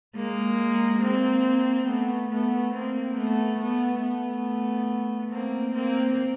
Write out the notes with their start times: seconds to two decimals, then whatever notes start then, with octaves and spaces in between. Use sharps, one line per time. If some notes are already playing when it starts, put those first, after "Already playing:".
0.15 G#3 A#3
1.01 A#3 C4
1.87 A3 B3
2.30 A3 B3
2.73 A#3 C4
3.16 A3 B3
3.58 A3 B3
4.02 A3 B3
5.30 A#3 C4
5.74 A#3 C4